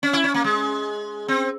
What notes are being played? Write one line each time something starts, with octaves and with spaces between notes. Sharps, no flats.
C#4
E4
C#4
A#3
G#3
C4